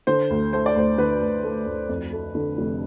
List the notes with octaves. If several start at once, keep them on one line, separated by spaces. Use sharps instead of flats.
D3 C5
D2
A3 C5
D5
D2 C5
D3 B4
D2
A3
D2
F2
A3
D3
F1